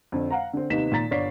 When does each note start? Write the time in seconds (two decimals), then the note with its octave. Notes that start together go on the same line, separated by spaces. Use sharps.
0.12 F2 D3
0.31 F5 F#5 A#5
0.53 D3 C4
0.70 D#2 C3 B3 D#4 B6 E7
0.92 A#2 D#3 A#5 A6 B6
1.11 G1 D3 C#5 D5 B6 C7